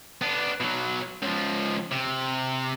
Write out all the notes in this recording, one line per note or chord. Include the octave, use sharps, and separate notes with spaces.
B3 D4
B2 F#3
C#2 F3
C3